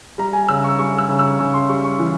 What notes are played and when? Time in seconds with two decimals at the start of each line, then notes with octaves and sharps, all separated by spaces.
0.18 G3 A#5
0.33 G#5
0.49 C#3 E6
0.64 C#6
0.79 G3 C#6
0.98 E6
1.09 C#3
1.19 E6
1.39 C#3 C#6
1.54 C6
1.69 G3 C#6
1.84 C#6
1.99 E3